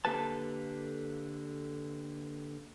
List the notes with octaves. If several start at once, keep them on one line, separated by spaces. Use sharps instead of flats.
D3 A#3 G4 A4 B4 A5